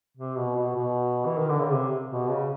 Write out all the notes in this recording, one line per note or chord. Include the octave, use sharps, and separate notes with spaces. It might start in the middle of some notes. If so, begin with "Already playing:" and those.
C3
B2
B2
B2
E3
D#3
D3
C#3
C3
B2
C#3